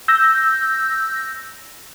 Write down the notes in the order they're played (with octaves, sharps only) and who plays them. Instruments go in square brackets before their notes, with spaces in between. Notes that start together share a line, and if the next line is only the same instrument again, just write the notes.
[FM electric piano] E6 G6 A#6